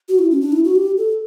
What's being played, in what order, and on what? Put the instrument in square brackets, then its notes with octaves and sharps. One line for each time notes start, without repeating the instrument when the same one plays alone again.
[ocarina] F#4
E4
C#4
D4
E4
F#4
G4
A4